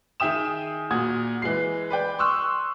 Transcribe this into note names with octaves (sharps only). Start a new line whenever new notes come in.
D#3 G#4 E5 G5 D#6 E7
A#2 F#4 D#6 G#6
E3 G#3 C7
B4 D5 G5
C6 C#6 D#6 E6 F#6